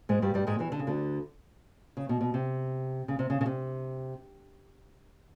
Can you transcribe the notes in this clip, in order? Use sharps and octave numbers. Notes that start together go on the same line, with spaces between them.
G#2 G#3
G2 G3
G2 G3
G#2 G#3
E2 E3
D3
C#3
D2 D3
C#3
B2
B2
C3
C#3
C3
C#3
C#3
C3